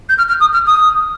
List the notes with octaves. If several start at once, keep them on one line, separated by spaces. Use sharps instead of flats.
G6
F6
F6
D#6
F6
D#6